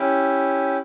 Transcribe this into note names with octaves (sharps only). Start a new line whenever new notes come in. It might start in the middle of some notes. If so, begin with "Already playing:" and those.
Already playing: C#4 E4 G4